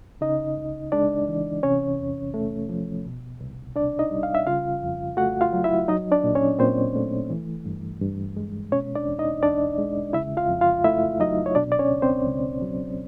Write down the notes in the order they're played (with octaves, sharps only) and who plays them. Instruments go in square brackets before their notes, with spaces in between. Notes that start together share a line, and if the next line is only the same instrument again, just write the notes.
[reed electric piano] C#3 D#4 D#5
C#2
G#3 D4 D5
E3
C3 C#4 C#5
E2
A3
F3
B2
C2
C2 D4 D5
D#4 D#5
G3
F5
E5
C#3 F4 F5
F2
A3 F#4 F#5
F4 F5
F#3
E4 E5
F#3 D#4 D#5
D4 D5
A#2
C#4 C#5
A#2 C4 C5
A3
E3
G2
G2
G#3
B2 C#4 C#5
D4 D5
E2
D#4 D#5
E2 D4 D5
G#3
C#3 E4 E5
F4 F5
F2
F4 F5
A3 E4 E5
F#3 D#4 D#5
C#5
B2 D4 D5
D5
C#4 C#5
C#2
C4 C5
C#2
F#3